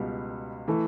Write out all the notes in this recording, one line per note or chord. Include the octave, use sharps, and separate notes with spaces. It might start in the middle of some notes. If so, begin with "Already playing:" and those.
Already playing: C#2 B2 G3
E3 A3